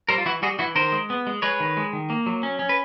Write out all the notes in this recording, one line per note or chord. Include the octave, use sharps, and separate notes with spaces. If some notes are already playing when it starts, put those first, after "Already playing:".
G3 A#4 C5
F4
E3 E4 F#4
G3 F#4 G#4
E3 E4 F#4
D#3 A#4 C5
G#3
B3
G#3
G#3 B4 C#5
D#3
G#3
D#3
A#3
F#3
C#4
C#4
B4